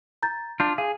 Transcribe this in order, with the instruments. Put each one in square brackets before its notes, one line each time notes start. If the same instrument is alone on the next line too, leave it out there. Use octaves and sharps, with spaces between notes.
[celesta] A#5 G6 A6
[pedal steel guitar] D4 F4 [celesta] G6
[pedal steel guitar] G#4 [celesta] F5